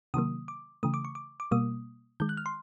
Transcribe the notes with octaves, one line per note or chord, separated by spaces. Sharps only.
C3 D#3 F#3 A#3 D#6
D6
C#3 E3 A3 D#6
D6
C#6
D6
D6
B2 G3 A#3 D#6
D#3 G#3 G6
F#6
F6
C6